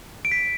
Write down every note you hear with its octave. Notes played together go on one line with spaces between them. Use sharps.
D7
B6